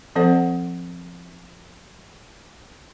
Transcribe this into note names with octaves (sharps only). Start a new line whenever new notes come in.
F3 C4 A4 C5 F#5